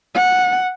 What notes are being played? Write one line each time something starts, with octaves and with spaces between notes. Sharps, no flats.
F#5